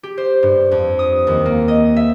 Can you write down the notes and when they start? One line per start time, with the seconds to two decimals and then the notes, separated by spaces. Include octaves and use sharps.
0.03 G4
0.18 C5
0.43 G2
0.71 F2
0.99 D#6
1.27 D#2
1.45 A#3
1.68 D#5
1.96 E5